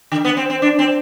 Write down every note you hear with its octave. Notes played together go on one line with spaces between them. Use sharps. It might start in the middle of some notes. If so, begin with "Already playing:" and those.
D3
B3
C4
C4
D4
C4